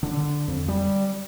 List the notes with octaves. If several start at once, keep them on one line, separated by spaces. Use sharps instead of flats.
D3
F2
G3